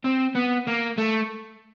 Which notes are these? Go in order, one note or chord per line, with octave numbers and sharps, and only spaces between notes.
C4
B3
A#3
A3